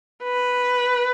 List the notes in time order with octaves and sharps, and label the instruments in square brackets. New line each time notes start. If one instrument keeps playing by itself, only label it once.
[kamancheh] B4